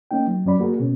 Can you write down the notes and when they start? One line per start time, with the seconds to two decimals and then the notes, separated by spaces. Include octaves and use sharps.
0.11 A#3 C#4 D#4 G5
0.27 F#3
0.45 F#2 F#3 C#4 D5 B5
0.59 A#3 F#4 G#4 A#4
0.80 B2 B3 C#4